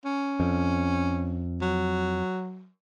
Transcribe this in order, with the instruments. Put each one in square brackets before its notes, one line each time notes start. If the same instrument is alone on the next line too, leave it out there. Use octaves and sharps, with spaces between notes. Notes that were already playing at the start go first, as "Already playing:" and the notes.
[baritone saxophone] C#4
[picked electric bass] F2
[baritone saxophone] F#3